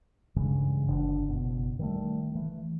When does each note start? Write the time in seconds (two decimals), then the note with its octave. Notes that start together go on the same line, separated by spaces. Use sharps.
0.36 G2 C#3 E3 G#3
0.88 F#1 D3 D4
1.27 F#1 B2
1.79 D#3 G3 A3
2.32 E3 A3